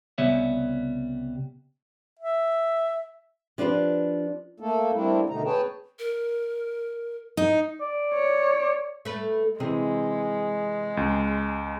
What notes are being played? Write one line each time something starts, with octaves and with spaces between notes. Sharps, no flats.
C2 C#3 G3 B3 C#5 E5
E5
F3 D4 F4 G4 B4
A3 A#3 A4
G3 A3 A#3 C4 D4 E4
B2 D3 D#3 A3 D#4 A#5
G#4 B4 C#5 G5 A5
A#4
D#4
D5
C#5
A3 B4
C3 E3 G#3 G#4
C#2